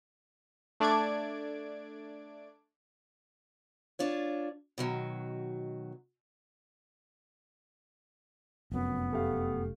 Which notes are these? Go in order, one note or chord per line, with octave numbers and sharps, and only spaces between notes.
A3 D4 D5 D6 G#6 D7
D4 F4 C#5
B2 D#3 F#3
F1 F#2 B3
A3 G4 F5